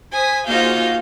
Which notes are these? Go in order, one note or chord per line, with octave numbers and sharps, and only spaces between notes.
C5 G#5 D#6 B6
A#3 D#4 F4 F#4 G#4 C5 F5 G6